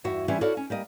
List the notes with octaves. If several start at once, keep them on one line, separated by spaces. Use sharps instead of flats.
E2 G2 E4 F#4 E5
E3 G3 C#4 E4 C5
E4 F#4 A4 C#5 D5 F5
C#4
G3 A#3 D#5